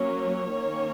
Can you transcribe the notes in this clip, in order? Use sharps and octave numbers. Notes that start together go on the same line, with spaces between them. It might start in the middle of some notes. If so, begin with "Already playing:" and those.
Already playing: F#3 A#3 C#4 C#5
D#3 A#3 C#4